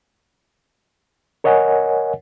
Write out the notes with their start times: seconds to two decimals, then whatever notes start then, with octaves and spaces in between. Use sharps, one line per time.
1.44 A#4 C#5 D#5 F#5 G#5